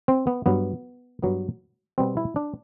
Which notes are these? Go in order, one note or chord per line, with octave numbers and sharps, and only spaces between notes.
C4
B3
G2 F#3 B3
G2 F#3 B3
B2 G3 B3 C4
E4
D4